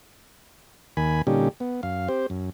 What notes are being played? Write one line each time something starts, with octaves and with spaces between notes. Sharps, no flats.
D#2 D#3 G#5 B5
A#2 D3 G3 C#4 D#4 G4
B3
F#2 F5
C4 G4 C5
F#2